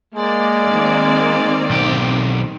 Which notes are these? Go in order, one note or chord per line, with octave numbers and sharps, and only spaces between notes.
G#3 A#3 D5
D#3 C4
B1 G4